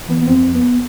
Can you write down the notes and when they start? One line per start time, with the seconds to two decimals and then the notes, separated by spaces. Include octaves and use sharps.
0.08 E3 B3
0.21 B3
0.26 F2 C4
0.46 F2
0.55 B3